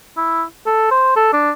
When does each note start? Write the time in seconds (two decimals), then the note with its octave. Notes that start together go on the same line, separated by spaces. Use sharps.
0.17 E4
0.66 A4
0.91 C5
1.16 A4
1.33 D4